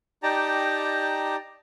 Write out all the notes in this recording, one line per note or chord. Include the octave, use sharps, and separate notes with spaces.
D#4 G4 D5 G5 A5 A#5